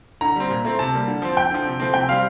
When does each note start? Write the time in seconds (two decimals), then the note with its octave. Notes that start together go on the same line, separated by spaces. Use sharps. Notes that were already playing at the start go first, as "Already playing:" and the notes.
0.21 D3 A#5
0.36 G3 C4
0.50 A#2
0.65 A3 C4
0.79 C3 A5
0.94 G3 A#3
1.08 D3
1.22 F3 C4
1.37 F2 G5
1.51 D3 F3
1.65 C3
1.80 F3 A3 C4
1.94 C3 G5
2.09 G3 C4 F5